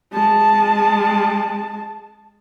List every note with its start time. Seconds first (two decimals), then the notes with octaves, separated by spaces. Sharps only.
0.13 G#3 A5